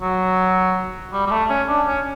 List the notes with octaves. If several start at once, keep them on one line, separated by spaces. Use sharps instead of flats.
F#3
G3
G3
A3
C#4
D4
C#4